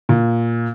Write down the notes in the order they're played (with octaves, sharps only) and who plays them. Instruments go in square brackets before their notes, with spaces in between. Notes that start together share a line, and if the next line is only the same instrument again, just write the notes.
[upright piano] A#2